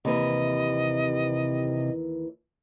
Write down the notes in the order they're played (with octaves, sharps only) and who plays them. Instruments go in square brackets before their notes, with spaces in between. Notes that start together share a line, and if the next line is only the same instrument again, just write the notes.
[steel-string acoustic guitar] D#2 E3 [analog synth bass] C3 [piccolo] D#5